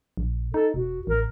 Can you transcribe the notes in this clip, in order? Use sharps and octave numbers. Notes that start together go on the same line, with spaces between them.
A#1
D#4 A4
E1 F#4
A1 A#4